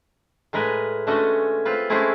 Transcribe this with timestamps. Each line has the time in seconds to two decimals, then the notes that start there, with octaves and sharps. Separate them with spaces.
0.53 A2 G#3 A#4 B4 G#5
1.07 D3 G#3 A3 C#4 F#4 D#5
1.65 C4 F4 B4
1.90 G#3 A3 C4 C#4 E4 G#4